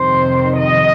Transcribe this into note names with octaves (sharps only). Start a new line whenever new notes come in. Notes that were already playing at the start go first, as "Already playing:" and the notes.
Already playing: F2 C3 D#3 C5
D#5